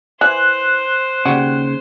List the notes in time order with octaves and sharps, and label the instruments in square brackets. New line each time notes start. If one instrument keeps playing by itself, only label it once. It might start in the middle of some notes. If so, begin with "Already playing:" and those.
[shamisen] E3 [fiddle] C5 [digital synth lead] F#6
[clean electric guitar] D#2 C#3 [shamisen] G3 F#4